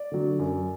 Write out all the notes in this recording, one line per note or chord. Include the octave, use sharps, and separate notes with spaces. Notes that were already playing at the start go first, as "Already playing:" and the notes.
Already playing: D5
D3 F#3
F#2